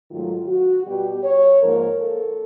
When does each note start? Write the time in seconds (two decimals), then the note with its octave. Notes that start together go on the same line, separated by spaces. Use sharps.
0.10 G#2 D#3 F#3 A3 F4
0.47 F#4
0.86 B2 G3 B3 G4
1.23 C#5
1.61 G#2 F3 A#3 A#4
2.00 A4